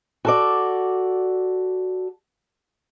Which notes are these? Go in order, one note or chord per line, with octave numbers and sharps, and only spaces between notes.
F#4 A4 D5